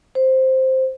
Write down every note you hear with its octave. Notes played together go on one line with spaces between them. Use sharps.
C5